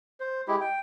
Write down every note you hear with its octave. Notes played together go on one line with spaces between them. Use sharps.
C5
G#3 E4 G4
G5